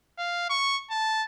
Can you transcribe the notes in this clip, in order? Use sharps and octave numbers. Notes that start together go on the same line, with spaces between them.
F5
C#6
A5